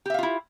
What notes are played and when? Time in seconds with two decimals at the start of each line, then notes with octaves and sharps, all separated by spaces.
0.06 G4
0.10 E5
0.14 F5
0.19 F4
0.23 E4